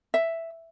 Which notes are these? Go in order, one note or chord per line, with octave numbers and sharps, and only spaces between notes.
E5